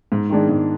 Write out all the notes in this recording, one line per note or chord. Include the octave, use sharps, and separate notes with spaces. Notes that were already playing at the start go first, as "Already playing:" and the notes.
G#2
D#3 G#3 D4
G#2